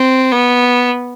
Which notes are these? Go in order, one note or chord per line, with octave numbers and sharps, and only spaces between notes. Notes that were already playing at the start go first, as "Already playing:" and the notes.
Already playing: C4
B3